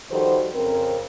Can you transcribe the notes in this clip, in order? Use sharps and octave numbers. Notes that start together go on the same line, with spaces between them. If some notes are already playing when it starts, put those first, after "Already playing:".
D#3 F3 G3 F#4 A4 C5
F2 C#3 C4 A#4